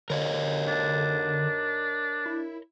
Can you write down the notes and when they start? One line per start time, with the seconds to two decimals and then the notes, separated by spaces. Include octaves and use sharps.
0.10 D3 A#4 C#5 D#5
0.68 D4
2.26 E4